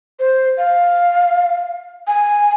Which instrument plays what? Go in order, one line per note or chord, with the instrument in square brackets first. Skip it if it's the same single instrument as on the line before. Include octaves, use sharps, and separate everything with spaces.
[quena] C5
F5
G#5